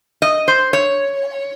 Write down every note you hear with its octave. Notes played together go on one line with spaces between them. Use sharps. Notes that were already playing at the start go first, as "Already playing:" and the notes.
D#5
C5
C#5